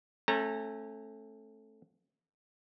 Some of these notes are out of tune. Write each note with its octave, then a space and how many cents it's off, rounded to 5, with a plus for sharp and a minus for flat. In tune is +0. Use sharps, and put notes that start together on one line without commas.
A3 +0 C#4 -35 A#5 -30